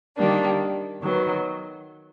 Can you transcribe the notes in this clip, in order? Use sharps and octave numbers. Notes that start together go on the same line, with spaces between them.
D#3 G3 A#3 D4
D#3 F#3 B3